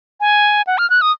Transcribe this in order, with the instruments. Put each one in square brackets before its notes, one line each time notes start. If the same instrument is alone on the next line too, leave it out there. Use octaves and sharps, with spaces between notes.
[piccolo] G#5
F#5
F6
F#6
D#6